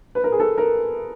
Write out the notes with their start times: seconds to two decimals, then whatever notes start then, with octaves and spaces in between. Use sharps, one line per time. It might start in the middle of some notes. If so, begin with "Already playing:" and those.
0.15 B4
0.24 A#4
0.32 G#4
0.40 A4
0.58 A#4